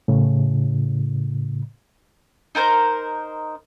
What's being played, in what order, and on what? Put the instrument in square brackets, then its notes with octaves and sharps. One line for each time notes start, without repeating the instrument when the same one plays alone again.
[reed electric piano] A2 C#3
[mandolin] D#4 A#4 C5 G6